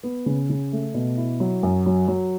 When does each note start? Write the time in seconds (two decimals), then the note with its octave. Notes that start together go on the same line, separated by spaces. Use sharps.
0.03 B3
0.26 C#3
0.50 C#3
0.72 A3
0.94 B2
1.17 E4
1.40 F#3
1.63 F#2
1.86 F#3
2.08 F#3